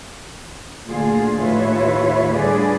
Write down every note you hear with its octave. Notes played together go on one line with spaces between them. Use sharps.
D2 A#2 D3 F4 G#4
D#2 A2 F4 B4 C#5 E5
A2 D3 G3 G#4 B4 D5